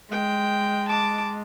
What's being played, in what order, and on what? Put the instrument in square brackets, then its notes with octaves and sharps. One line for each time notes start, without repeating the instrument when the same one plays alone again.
[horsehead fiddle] G#3 [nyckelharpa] G5
[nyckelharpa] A5 D6